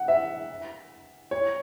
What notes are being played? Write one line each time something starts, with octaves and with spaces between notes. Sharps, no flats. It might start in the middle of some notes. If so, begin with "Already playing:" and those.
Already playing: F#5
E5
C#5